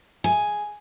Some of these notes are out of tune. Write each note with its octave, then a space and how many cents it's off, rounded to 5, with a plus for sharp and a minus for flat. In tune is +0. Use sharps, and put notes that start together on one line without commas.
G#4 +0 G#5 +0